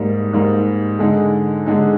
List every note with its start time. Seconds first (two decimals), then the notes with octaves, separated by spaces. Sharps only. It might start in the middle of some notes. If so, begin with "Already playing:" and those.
Already playing: G#2 G3 A#3 D#4
0.33 G#2 G3 A#3 D#4
0.99 D3 G#3 D#4
1.66 D3 G#3 D#4